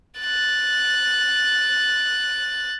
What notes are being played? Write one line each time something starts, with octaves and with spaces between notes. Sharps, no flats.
F#6 A6